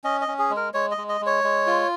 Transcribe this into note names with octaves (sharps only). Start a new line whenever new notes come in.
C#4 D#5
D#5
C#4
G#4
G#3
A#4
G#3 C#5
D#5
G#3
D#5
G#3
C#5
G#3
F4